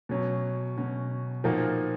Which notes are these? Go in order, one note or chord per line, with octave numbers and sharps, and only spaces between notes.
B2 F#3 C#4
B2 F#3 C#4
A#2 F3 A#3 D#4 F#4